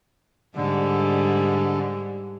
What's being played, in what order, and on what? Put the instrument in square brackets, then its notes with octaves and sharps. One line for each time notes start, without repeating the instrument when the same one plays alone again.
[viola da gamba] G#2 G3 [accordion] D3